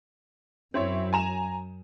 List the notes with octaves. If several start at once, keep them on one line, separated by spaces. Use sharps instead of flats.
F#2 C4 E4 C#5
G#5 A#5 E7